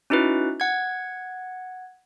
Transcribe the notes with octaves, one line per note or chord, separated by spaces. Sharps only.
C#4 D#4 E4 F#4 B4
F#5 G#6